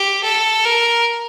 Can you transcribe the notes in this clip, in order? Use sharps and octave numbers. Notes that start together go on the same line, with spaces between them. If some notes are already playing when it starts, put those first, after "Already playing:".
Already playing: G4
A4
A#4